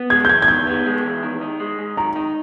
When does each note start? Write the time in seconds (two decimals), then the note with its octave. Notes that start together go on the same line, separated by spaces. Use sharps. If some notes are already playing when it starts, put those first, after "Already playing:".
Already playing: B3
0.10 G#3 G#6
0.25 G6
0.29 E2 G#6
0.42 G#6
0.48 D#3 G6
0.67 B3
0.86 G#3
1.04 E2
1.22 D#3
1.41 D#4
1.60 G#3
1.79 G#2
1.97 D#3 A#5
2.16 D#4